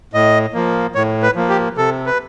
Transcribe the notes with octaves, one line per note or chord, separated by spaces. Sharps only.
A2 D#5
F3 A#3
A2 C#5
B4
F3 A#3
G4
C3 A4
B4